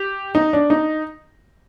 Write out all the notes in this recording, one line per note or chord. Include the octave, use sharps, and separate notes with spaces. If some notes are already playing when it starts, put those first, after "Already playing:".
Already playing: G4
D#4
D4
D#4